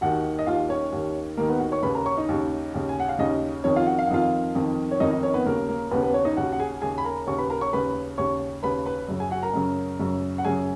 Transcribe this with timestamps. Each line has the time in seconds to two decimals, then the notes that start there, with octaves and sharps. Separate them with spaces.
0.01 D#2 D#3 F#4 F#5
0.39 D#5
0.46 D#2 D#3 F4 F5
0.69 C#4 C#5
0.92 D#2 D#3
1.37 D#2 D#3 A#3 A#4
1.48 B3 B4
1.60 F#4 F#5
1.72 C#5 C#6
1.82 D#2 C#3 B4 B5
1.95 A#4 A#5
2.06 C#5 C#6
2.17 D#4 D#5
2.29 D#2 C#3
2.74 D#2 C#3
2.89 G#5
3.00 F#5
3.09 F5
3.19 D#2 C#3 D#4 D#5
3.64 F2 D#3 C#4 C#5
3.76 F4 F5
3.86 F#4 F#5
3.99 F5
4.07 F#5
4.10 F2 D#3 F4 F5
4.55 F2 D#3
4.91 C#5
5.00 F2 D#3 D#4 D#5
5.11 D#4 D#5
5.23 C#4 C#5
5.34 B3 B4
5.46 D#2 C#3 A#3 A#4
5.69 A#3 A#4
5.91 D#2 B3 B4
5.94 C#3
6.02 B3 B4
6.14 C#4 C#5
6.25 D#4 D#5
6.37 D#2 C#3 F#4 F#5
6.52 F#5
6.60 G#4 G#5
6.81 D#2 C#3 G#4 G#5
6.98 B5
7.05 A#4 A#5
7.27 D#2 C#3 C#5 C#6
7.38 B4 B5
7.50 A#4 A#5
7.61 C#5 C#6
7.73 D#2 C#3 B4 B5
8.18 D#2 C#3 C#5 C#6
8.63 D#2 C#3 B4 B5
8.86 B4 B5
9.08 F#2 C#3
9.20 G#4 G#5
9.31 F#4 F#5
9.43 A#4 A#5
9.53 F#2 C#3
9.99 F#2 C#3
10.38 F#5
10.45 F#2 C#3 G#4 G#5